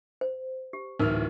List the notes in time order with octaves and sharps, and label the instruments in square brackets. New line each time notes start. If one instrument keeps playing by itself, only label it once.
[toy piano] C5
G4
[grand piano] D1 E3 F6 [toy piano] D#4 A#4 D6